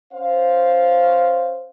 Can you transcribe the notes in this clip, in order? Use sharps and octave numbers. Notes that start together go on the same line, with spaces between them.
C#4 C5 F5